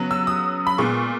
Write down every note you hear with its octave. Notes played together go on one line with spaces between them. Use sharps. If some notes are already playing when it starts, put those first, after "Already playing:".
Already playing: C#3 F#3 B3
E6
D#6
B5
A#2 G#3 B3 C#6